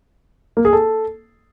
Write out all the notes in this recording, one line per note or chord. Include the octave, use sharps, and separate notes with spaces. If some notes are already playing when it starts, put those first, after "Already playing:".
A#3
G#4
A4